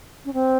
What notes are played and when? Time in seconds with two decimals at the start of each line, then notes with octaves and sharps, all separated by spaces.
0.25 C#4
0.33 C4